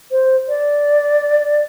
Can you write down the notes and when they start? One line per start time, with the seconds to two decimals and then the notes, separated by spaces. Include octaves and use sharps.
0.11 C5
0.49 D5